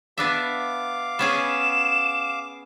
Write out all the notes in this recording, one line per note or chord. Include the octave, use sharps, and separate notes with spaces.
B3 D4 E5 F5 D6
B3 C#4 G#4 E7